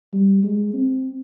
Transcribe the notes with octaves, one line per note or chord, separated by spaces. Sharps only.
G3
G#3
C4